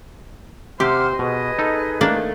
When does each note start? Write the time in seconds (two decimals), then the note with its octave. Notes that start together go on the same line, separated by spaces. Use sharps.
0.80 C3 G4 C5 F#5 D6 F6
1.19 B2 G#4 B4 D#5
1.59 D#4 A4
2.01 A3 A#3 D4